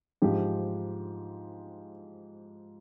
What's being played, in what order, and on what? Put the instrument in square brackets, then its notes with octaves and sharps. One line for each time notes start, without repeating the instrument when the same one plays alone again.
[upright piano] G#2 F3 G4